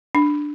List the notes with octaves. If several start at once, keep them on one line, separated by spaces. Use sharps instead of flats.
D4